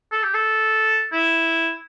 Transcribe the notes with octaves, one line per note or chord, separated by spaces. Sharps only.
A4
G4
A4
E4